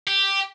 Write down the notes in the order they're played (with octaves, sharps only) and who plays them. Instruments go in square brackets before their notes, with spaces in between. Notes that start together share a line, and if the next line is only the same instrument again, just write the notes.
[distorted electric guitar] G4